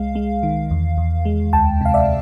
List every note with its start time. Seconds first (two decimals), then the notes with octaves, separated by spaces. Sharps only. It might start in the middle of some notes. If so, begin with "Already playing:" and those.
Already playing: C2 G#3 F5
0.15 G#3
0.43 D#3
0.71 E2
0.98 E2
1.25 G#3
1.53 D2 G5 A5
1.81 C3 F5
1.94 D5 E5